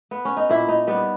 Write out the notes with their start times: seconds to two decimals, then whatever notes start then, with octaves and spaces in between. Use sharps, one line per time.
0.11 B3
0.25 C#4
0.37 D#4
0.49 A#2 E4
0.68 D#4
0.87 G3 B3